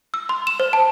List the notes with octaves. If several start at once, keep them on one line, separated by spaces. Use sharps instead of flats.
E6
C6
E7
C5
A5